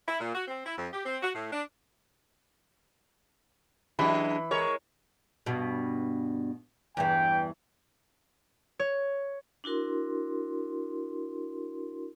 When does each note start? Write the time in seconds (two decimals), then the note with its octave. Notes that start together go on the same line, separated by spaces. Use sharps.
0.08 E4
0.20 A#2
0.35 F#4
0.48 C4
0.66 E4
0.77 F2
0.93 G4
1.06 C4
1.22 F#4
1.35 A2
1.52 D4
3.99 E3 F#3 G#3 D4 B5
4.51 G#3 A#4 C#5
5.46 G2 B2
6.97 E2 G2 E3 G5
8.79 C#5
9.64 D4 E4 F#4 A#4 C6